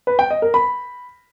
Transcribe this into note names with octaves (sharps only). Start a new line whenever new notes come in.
B4
G5
D#5
A#4
B5